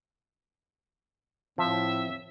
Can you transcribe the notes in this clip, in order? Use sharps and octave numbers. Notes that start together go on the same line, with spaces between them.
A2 F3 C4 E5